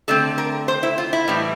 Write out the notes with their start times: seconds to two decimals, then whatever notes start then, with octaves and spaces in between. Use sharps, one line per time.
0.08 D3 A3 C4 A4
0.38 A#4
0.68 C5
0.83 E4
0.98 F4
1.13 E4
1.28 A2 E3 G3